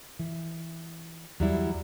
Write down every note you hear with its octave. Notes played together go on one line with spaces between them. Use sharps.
E3
E2 F#3 G3 E4